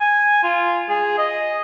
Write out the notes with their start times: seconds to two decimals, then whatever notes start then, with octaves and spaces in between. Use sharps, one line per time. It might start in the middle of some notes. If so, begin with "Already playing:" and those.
0.01 G#5
0.43 F4
0.90 G#4
1.18 D#5